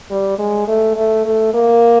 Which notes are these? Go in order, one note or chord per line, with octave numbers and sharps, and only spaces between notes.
G3
G#3
A3
A3
A3
A#3